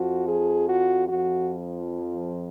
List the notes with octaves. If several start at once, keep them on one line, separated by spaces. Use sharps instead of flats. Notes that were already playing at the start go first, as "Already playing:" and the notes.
Already playing: F2 F3 F#4
G#4
F#4
F2 F3 F#4